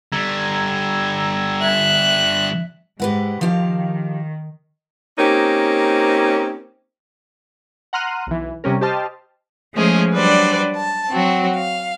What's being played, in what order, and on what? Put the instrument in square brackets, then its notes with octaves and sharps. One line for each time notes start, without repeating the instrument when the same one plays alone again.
[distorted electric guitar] D3 G3 [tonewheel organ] A#5 E6 G#6
[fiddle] E5 F#6
[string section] G#2 [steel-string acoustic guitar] G4 B4 F#5
[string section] D#3 [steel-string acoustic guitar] F3 G4 F5
[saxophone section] A#3 C4 C#4 D#4 G4
[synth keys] F#5 A#5 C6 F6 F#6 D#7
B1 E3
C3 G3 C#4 A#4
G4 C5 D#5 A5 C6 F6
[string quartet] F3 G#3 A3 C#4 G#4 C5
F#3 G3 D4 B4 C5 D5
A5
F#3 C4 F#4
F5